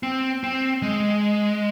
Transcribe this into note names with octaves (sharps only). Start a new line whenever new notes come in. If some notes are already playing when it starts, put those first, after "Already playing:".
C4
C4
G#3